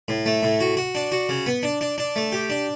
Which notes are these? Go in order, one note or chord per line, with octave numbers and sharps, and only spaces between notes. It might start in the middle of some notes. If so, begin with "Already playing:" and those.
A2
A3
A2
F#4
F#4
D4
F#4
C#3
B3
D4
D4
D4
A3
G4
D4